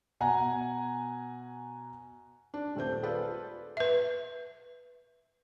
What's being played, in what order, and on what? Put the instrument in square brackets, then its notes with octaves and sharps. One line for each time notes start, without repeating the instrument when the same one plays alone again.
[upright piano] B2 F#5 G#5 A#5
[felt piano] D4
D#1 A3 C4 G6
F4 G#4 A4 B4 D5 F5
[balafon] B4 E5